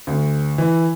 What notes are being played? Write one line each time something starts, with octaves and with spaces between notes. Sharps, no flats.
D2
E3